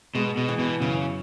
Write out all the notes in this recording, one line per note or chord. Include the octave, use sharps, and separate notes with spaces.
B2 G#3
B2
E3
B2
F#2 C#3